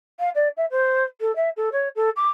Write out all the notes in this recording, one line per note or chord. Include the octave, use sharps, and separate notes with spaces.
F5
D5
E5
C5
A4
E5
A4
C#5
A4
D6